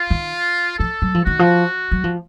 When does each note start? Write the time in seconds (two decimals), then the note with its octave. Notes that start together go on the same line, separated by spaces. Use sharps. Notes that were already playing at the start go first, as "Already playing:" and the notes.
Already playing: F4
0.10 D#3
0.79 F3 A4
1.02 F#3
1.15 F3
1.24 D#3 F#4
1.39 F3
1.92 F#3
2.04 F3